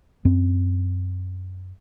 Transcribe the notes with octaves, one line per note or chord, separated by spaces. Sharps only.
F#2 C4